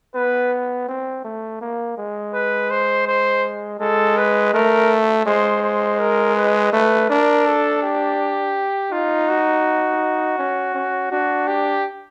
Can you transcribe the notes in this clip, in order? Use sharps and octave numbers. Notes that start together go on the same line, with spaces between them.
B3 B4
C4
A3
A#3
G#3
B4
C5
C5
G#3 A4
B4
A3 A#4
G#3 C5
C5
A#4
B4
A3 B4
D4 A#4
A4
G4
D#4 F4
F#4
C#4
C#4
D4 F#4
G4